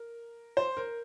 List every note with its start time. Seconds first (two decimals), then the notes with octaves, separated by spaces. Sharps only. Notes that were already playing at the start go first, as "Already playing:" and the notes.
Already playing: A#4
0.57 C5
0.77 A#4